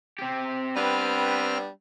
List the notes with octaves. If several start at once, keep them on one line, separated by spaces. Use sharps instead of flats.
C4 G4
G3 B3 C4 D4 B4 F6